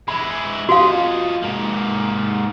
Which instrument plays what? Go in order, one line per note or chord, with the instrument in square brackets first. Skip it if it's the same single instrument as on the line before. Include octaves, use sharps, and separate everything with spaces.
[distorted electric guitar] G#3 E4 [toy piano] B5
[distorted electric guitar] F3 D#5 [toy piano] F#4 F5
[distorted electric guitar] G#2 A#3